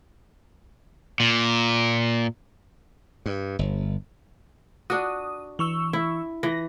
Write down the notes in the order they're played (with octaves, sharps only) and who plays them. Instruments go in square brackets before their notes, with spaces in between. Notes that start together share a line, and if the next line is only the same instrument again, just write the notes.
[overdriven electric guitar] A#2
[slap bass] G2
G1
[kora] D4 F#4 [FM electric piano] D#6
[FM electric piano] E3 C#6 E6
[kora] E4
[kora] E3 [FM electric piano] A#6